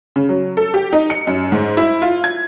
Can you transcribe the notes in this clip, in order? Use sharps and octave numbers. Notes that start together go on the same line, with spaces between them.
C#3
F#3
A4
G4
D#4
C#7
F#2
G#2
E4
F4
G#6